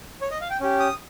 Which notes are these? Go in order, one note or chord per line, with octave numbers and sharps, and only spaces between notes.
C#5
D#5
F5
G5
C#4 G4
D#6